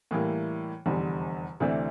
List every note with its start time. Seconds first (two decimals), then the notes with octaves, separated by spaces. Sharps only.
0.11 A2 E3 G3 A#3
0.86 F1 E2 D3 G3
1.60 D2 C3 E3 A3 D4